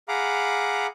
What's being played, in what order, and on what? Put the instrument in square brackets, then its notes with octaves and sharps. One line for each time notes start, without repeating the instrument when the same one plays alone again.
[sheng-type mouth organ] G#4 F5 F#5 A#5 B5 D6